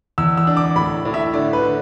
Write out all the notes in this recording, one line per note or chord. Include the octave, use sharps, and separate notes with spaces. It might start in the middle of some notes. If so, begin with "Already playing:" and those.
E2 E6
E6
D4
D6
A2 B5
A2
E5
D3 D5
B4
D3